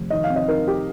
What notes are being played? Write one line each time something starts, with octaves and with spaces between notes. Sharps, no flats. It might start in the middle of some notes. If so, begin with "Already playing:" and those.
Already playing: F1
D#3 D#5
F5
C4
D#5
D#4 A#4
G4